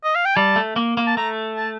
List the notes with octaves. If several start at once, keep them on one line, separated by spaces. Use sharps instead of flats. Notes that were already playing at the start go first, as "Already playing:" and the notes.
D#5
F5
G5
G3 A5
A3
A#3
A#3
A5
A3 A#5
A5